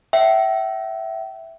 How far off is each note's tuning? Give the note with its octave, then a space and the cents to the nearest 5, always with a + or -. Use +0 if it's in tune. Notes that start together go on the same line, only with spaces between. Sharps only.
E5 +0 G5 -40